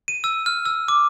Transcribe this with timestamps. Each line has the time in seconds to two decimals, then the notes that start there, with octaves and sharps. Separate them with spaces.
0.08 D#7
0.24 E6
0.46 F6
0.65 E6
0.88 D6